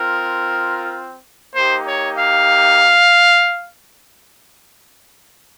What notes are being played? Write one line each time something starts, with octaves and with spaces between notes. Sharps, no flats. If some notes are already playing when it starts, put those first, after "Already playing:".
Already playing: C4 F4 A#4
A#3 D#4 G4 C5
C#5
F5